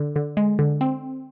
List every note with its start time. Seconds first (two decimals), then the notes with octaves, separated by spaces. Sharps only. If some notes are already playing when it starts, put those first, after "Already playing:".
Already playing: D3
0.16 D3
0.37 G#3
0.59 D3
0.81 C4